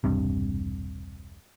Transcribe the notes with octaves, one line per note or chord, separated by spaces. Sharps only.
E1 C2 G2 C3